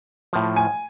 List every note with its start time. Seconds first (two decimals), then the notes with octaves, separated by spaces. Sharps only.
0.33 A2 F3
0.56 G#5